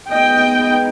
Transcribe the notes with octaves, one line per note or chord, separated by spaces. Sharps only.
G#3 B3 D#4 D#5 G5